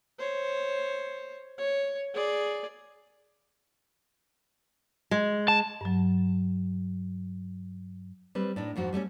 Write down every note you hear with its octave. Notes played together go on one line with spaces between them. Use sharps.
C5 C#5
C#5
G#4 D5
G#3
A5
G2 F#3
G3 C4 B4
A2 D4 D#4
F2 G#2 F3 F#4
G3 A3 B3 C#4